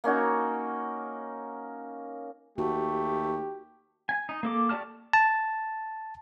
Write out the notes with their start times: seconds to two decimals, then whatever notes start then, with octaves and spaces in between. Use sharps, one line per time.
0.04 A#3 C#4 D#4 F#4
2.58 D#2 A3 F#4 G4
4.09 G#5
4.29 D#4
4.43 A#3 A4 D6
4.69 F#4 G4 D5 A5 F6
5.13 A5